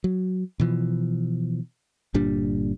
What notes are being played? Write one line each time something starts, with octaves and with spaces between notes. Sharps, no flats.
F#3
B2 E3 F3
G1 A#2 G3 D4